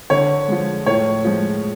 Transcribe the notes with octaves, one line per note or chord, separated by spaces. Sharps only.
D3 C#5
F3 G#3
A2 C#5
F3 G#3